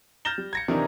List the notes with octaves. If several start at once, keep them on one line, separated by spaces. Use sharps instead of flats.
F6 G6 A6 A#6 E7 G7
G3
G#6 A#6 C#7
C3 D#3 E3 D4 D#4 A#4